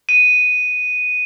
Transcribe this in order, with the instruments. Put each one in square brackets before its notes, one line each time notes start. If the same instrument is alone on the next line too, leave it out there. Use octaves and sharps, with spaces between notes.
[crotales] D#7